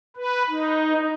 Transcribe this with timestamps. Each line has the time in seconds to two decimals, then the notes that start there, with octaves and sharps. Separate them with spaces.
0.16 B4
0.50 D#4